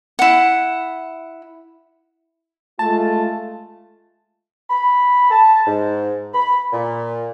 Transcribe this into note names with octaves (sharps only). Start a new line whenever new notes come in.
E4 F#5
G#3 A3 F4 A5
B5
A5
G#2
B5
A#2